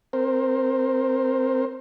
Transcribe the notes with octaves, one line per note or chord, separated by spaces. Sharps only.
C4 A#4 C5